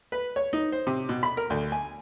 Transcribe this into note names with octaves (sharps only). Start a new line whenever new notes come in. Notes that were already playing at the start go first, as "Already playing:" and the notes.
B4
C#5
D#4
C5
C3
B2
B5
A#4
D2
G#5